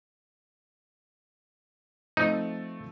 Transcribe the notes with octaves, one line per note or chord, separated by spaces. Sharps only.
F3 A3 C4 D#4